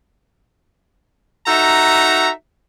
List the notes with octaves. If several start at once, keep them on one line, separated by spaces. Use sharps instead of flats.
D#4 F#4 A4 E5 A#5